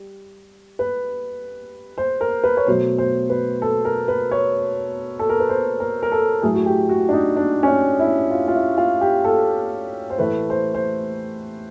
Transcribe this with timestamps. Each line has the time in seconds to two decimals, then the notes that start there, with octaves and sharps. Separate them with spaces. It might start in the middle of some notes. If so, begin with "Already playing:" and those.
Already playing: G3
0.79 B4
1.98 C5
2.21 A#4
2.44 B4
2.57 C#5
2.67 B2 F#3 A3 C5
2.98 C5
3.30 B4
3.62 A4
3.85 A#4
4.08 B4
4.31 C#5
5.19 A4
5.29 A#4
5.40 B4
5.49 C5
5.80 A#4
6.03 A#4
6.12 A4
6.42 A2 F#3 A3 G#4
6.55 F#4
6.66 G4
6.89 F#4
7.09 D4
7.13 D#4
7.37 D4
7.63 C#4
7.67 D4
7.99 E4
8.31 F4
8.48 F4
8.54 E4
8.78 F4
9.01 G4
9.24 A4
10.10 C5
10.18 A2 E3 A3 B4
10.50 C5
10.75 C5